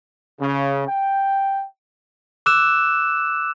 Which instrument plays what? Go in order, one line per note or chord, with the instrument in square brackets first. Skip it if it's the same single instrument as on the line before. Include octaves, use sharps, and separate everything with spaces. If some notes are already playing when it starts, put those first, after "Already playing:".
[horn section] C#3
G5
[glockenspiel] D6 E6 F#6 E7